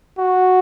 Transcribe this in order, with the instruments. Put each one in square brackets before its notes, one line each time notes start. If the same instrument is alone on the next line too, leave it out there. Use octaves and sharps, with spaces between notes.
[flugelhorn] F#4